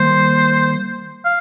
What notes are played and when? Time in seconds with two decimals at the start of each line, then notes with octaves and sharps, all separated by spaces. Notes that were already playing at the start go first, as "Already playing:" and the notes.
Already playing: D#3 G3 A#3 C5
1.25 F5